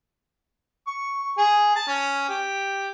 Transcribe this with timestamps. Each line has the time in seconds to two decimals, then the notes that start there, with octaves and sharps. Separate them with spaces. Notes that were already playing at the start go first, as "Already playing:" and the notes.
0.87 C#6
1.37 G#4
1.75 A5
1.88 C#4
2.29 G4